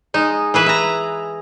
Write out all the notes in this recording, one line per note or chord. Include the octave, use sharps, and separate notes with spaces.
G#3 D#4
E3 G#4 B4 E5
E5 A#5